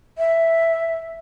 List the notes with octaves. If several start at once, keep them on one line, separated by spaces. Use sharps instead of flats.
E5